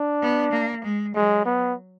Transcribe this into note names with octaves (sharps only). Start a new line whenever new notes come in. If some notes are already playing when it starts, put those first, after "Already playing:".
Already playing: D4
B3
A#3
G#3
F#3 G#3
B3